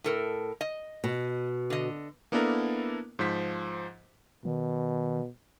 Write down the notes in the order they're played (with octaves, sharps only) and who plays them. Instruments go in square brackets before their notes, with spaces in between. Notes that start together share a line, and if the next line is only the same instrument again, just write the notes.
[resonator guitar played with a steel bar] A2 A4 A#4
D#5
[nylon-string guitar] B2
[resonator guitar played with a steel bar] D3 D#5
[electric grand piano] A#3 B3 D4 E4 A4 A#4
G#2 F3 C5 B6
[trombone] B2 [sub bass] D#3